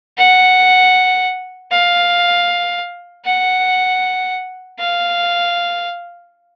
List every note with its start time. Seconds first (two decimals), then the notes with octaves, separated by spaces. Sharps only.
0.18 F#5
1.72 F5
3.25 F#5
4.79 F5